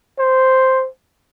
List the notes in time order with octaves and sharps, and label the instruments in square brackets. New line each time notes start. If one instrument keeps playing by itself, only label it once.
[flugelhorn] C5